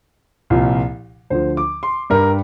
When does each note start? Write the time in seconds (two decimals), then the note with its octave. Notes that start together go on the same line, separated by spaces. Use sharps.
0.50 C2 A#2 F3
1.30 D2 D3 F3 C5
1.57 D6
1.83 C6
2.10 G2 G3 A#4